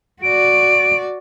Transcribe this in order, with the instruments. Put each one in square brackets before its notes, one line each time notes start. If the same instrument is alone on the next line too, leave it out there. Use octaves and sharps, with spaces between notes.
[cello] F#4 D5 [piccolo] D7